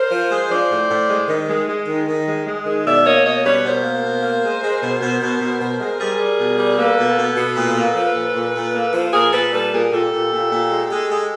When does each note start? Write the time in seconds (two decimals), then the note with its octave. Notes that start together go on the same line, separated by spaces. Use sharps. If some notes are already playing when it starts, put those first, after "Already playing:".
Already playing: A#4 C5
0.10 F3
0.30 G#3
0.50 F3 C5 D5
0.69 A2
0.89 A2
1.09 G#3
1.28 D#3
1.48 G#3
1.67 G#3
1.87 D#3
2.07 D#3
2.26 G#3
2.46 G#3
2.66 D#3
2.85 B2 D5 E5
3.05 A#3 C#5 D#5
3.25 B2 C#5 D#5
3.44 G3 B4 C#5
3.64 B2 A#4 C5
3.83 A#3
4.03 B2
4.22 A#3
4.43 G#3
4.62 G#3
4.82 B2
5.01 B2
5.21 B2
5.41 B2
5.60 B2
5.80 G#3
5.99 G3 G#4 A#4
6.19 G3
6.39 B2
6.58 G3
6.78 A#3 A4 B4
6.98 B2
7.17 B2
7.37 B2
7.56 A#2
7.76 A#3
7.95 F3
8.15 A#2
8.35 A#2
8.55 A#2
8.74 A#3
8.94 F3
9.13 A#2 G#4 A#4
9.33 A#2 A4 B4
9.52 G3 A4 B4
9.72 A#2 G#4 A#4
9.92 A#2 G4 A4
10.12 A#2
10.31 A#2
10.51 A#2
10.70 G#3
10.90 G#3
11.10 G#3